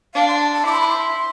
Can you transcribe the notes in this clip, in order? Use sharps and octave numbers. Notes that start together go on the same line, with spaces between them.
D4 F5
C6
A5
A5
E4 D6
C6
B5
C6